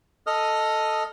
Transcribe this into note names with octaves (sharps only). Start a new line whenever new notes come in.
A4 D#5 D#6 F6